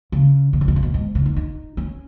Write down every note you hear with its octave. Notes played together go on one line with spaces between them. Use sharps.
C#3
B2
C#3
B2
C#3
B2
G#2
C#3
D#4
D#4
C#4